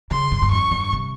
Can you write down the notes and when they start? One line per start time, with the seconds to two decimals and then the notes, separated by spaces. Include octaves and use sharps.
0.11 C#3 C6
0.32 G2
0.42 G2
0.51 F2 C#6
0.71 G2
0.93 C3